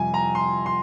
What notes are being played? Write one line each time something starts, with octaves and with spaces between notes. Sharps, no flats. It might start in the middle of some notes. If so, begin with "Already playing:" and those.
Already playing: F2 C3 G3 G#5
A#5
C6
C6